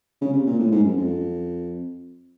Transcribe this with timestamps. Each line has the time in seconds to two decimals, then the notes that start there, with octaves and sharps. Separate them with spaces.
0.21 C#3
0.33 C3
0.47 A#2
0.59 A2
0.72 G#2
0.83 F#2
0.96 F2